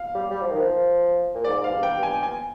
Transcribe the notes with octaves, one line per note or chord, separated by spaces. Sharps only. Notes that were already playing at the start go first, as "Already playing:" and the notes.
Already playing: F5
G3
G3
F3
D#3
F3
A#2
G#2 D5
G#2 F5
G2
G5
G2
G#5
G#5